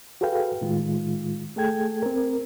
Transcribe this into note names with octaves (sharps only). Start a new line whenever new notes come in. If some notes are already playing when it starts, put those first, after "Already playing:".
F#4 G#4 A4 B4 F5 G5
A2 D#3 G#3 F4
A3 G#4 A4 G5 G#6
C4 A#4